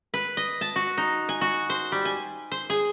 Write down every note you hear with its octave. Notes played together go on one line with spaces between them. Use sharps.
B4
D#5
A5
F#4
D#4
G#5
F#4
C5
G3
G#5
C5
G#4